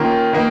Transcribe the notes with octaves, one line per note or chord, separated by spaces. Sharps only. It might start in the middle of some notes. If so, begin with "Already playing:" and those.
Already playing: D#3 A#3 C#4 F4
D#3 A#3